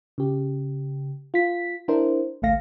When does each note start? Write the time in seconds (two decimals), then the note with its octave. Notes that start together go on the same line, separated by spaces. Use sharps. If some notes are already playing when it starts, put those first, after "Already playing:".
0.18 C#3 G4
1.34 F4 B6
1.88 D4 E4 A#4 C5
2.42 A1 D2 A3 F5 A#6